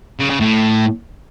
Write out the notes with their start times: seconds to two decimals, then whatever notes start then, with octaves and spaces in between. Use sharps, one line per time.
0.20 C#3
0.30 C#3
0.40 A2